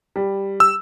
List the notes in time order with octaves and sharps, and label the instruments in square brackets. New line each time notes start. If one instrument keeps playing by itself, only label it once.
[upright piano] G3
[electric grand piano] E6